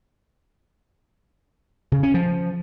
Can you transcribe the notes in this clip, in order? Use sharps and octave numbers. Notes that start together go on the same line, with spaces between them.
C#3
C#4
F3